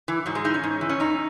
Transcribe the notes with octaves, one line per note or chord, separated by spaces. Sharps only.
E3
G#2 F#3
G#3
E3 D#4
C#4
G#2
E3
C#4
E2 D#4